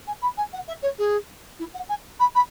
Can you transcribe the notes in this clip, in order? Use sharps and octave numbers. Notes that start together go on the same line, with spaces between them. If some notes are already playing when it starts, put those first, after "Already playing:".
G#5
B5
G#5
F#5
E5
C#5
G#4
E4
F#5
G#5
B5
B5